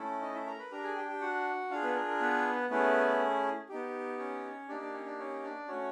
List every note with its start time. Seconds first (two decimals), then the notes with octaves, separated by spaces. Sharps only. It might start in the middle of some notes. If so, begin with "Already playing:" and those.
Already playing: A3 C#4 E4 A4
0.21 D#4 D#5
0.34 E4 E5
0.47 A#4 A#5
0.59 B4 B5
0.71 D4 G4 A#4 A#5
0.84 G#4 G#5
0.96 G4 G5
1.09 G4 G5
1.21 F#4 F#5
1.70 D4 F4 G#4 F5
1.83 B3 B4
1.95 A#4
2.08 A#4
2.20 B3 B4
2.70 A3 B3 C#4 E4 G#4 B4
3.69 B3 D#4 G4
4.19 C#4 C#5
4.68 A#3 D4 D#4 G4 D5
4.81 D4 D5
4.93 C#4 C#5
5.06 D4 D5
5.19 C#4 C#5
5.43 D4 D5
5.68 A3 C#4 F#4 C#5